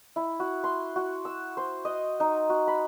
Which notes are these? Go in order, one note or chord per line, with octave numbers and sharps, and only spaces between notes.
E4
F#4
C6
F#4
E6
C5
D#5
D#4
F#4
B5